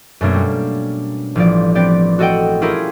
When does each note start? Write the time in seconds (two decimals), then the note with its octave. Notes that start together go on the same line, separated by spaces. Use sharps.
0.21 F#2 B2 A3 A#3 C#4 D4
0.34 G3
1.35 A1 F3 D5
1.75 B3 C4 G4 D5
2.19 F#4 A4 D#5 F#5 G5
2.61 C#4 E4 F4 G4 G#4 A#4